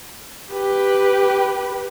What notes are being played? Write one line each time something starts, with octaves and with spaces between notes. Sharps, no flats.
G4 B4